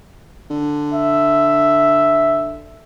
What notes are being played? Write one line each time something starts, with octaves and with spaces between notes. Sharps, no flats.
D3
E5